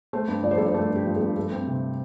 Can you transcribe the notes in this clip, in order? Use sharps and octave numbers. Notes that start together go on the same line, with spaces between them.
A3 C5
G2
F3 D5
C5
G2 A4
C5
A3 A4
G2
G4
F3
G2 A4
A3 A4
C4
C3